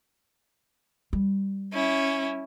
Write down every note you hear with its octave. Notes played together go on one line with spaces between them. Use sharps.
G3
C#4 E4